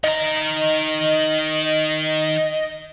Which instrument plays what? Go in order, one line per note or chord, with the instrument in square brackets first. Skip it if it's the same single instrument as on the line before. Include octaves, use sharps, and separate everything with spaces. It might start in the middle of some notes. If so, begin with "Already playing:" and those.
[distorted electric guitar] D#3 A#5 [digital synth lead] D#5